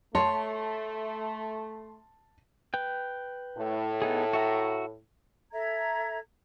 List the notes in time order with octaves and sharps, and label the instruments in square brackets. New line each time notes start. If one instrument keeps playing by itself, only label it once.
[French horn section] A3 [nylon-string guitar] C#5 [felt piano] A5 [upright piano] C6
[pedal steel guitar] B4 G5
[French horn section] A2
[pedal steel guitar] B3 D#4 G#4
F#4 E5 A#5
[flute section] A4 E5 A#5 G#6